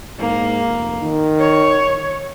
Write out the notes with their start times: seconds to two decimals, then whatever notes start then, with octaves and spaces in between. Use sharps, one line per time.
0.19 G#2 A#3
0.65 F1
1.02 D#3
1.39 C#5